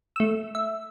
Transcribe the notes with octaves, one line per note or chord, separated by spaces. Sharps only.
A3 E6
E5